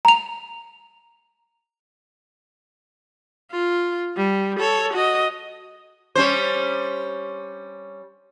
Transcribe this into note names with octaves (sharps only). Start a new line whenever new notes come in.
A#5 F7
F4
G3
A4 C#5
F#4 D#5
G3 C#4 C5